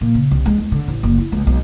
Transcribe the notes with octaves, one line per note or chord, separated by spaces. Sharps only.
A#2
C#3
C2
G#3
E2
D3
A1
F#1
E4
C#2
B1